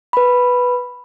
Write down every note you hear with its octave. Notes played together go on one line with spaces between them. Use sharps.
B4 B5